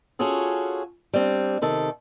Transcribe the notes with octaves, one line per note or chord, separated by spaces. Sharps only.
C#4 F4 F#4 G#4 A4
G3 C4 D4
C3 D#3 A4